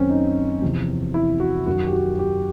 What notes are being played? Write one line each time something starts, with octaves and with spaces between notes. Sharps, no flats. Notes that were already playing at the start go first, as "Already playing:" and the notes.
Already playing: F#2 D#3 C4 C#4
D#4
E2 C3 F3
E4
F#4
F#2 D#3 F#4
G4
F#4
G4